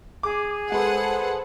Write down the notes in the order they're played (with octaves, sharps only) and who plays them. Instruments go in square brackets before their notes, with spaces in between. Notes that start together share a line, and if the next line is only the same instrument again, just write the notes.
[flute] G#4 [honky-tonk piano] D6
[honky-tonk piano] G#3 [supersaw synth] A4 B4 C5 [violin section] F#5